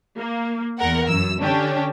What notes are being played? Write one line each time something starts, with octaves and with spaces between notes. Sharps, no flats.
A#3
E2 E3 A#4 F#5
F#2 E6
D3 C#4 D4 G4